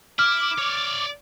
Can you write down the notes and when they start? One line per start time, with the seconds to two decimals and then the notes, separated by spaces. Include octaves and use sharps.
0.19 E4 D6 F6
0.58 C#5 D5